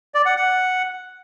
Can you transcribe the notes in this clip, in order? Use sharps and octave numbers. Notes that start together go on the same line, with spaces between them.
D5
F#5
F#5